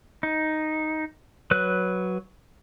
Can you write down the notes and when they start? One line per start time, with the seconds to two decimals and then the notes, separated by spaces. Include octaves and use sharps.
0.23 D#4
1.51 F#3 B4 F#6